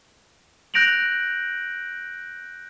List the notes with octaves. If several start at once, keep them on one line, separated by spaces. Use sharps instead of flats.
F#6 G6 A#6 D7 F7 F#7